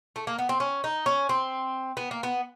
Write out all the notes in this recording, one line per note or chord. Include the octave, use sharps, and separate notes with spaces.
A3
A#3
B3
C4
C#4
D#4
C#4
C4
B3
A#3
B3